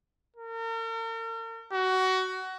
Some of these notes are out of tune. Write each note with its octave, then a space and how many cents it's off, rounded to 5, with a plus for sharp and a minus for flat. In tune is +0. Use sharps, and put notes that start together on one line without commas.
A#4 -40
F#4 +20